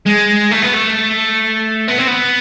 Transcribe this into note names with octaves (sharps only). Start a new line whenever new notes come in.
G#3
A3
B3
A3
B3
C4
B3